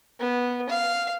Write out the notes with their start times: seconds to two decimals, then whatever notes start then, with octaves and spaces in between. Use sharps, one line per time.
0.20 B3
0.70 F5